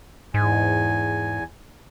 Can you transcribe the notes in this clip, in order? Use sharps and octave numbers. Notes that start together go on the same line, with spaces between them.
E2 G#2 G#5